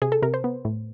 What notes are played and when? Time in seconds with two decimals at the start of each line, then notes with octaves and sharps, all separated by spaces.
0.02 C3 G#4
0.12 A4
0.22 C3 A#4
0.34 C5
0.44 B3
0.65 A2